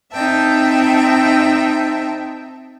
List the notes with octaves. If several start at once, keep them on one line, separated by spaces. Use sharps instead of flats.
C4 D#4 E5 G5 A5